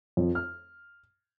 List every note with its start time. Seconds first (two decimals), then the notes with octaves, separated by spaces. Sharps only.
0.17 F2
0.35 F6